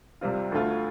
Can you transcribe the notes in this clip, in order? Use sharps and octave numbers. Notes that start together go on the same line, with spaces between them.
C2 C3 G3 C4 F4
D2 D3 A3 F4